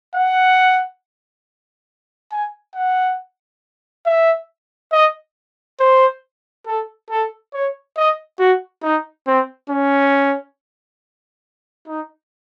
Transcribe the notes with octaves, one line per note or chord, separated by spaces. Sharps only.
F#5
G#5
F#5
E5
D#5
C5
A4
A4
C#5
D#5
F#4
D#4
C4
C#4
D#4